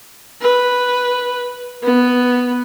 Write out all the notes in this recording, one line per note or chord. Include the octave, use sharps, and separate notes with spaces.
B4
B3